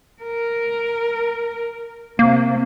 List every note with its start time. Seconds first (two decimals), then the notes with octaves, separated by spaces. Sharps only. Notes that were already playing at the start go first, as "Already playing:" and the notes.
0.22 A#4
2.19 C3 A#3